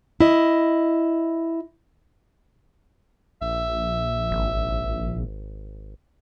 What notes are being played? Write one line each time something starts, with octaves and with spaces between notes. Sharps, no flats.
E4 D#5
A#1 E5
G#1